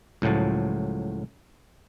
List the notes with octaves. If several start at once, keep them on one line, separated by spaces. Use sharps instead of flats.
C#2 A2 F3 F#3 A5